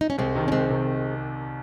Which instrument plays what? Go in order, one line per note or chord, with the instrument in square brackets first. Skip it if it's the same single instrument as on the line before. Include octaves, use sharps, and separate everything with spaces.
[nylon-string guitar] D#4
C#4
[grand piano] C2 [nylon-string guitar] G#3 C4
[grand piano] C3 D#3
[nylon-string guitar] C#4
[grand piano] C2 [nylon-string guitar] G#3 C4
[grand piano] C3 D#3